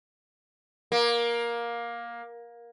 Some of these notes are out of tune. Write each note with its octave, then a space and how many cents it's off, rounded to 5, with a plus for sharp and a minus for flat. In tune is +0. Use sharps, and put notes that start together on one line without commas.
A#3 +15